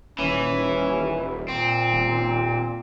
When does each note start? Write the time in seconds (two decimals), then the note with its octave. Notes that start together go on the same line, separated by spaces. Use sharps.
0.19 D#1 E3 C#4
1.48 A#2 C4
1.91 D#1